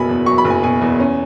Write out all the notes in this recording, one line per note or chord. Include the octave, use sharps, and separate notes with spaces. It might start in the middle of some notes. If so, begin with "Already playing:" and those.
Already playing: F#1 B2 F#3 G#5 B5
E2
F#3 C#6
B5
F#1
G#5
B2 G#5
E2
C#4